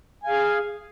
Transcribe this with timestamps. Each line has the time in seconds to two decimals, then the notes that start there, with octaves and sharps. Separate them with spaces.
0.24 G#5
0.27 F5
0.30 G#4